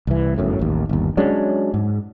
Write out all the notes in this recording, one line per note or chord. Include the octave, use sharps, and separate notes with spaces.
C2 E3
G1 F#2 A2
A1 D#2
G1 D#2
F#3 G#3 C#4 D4
G#2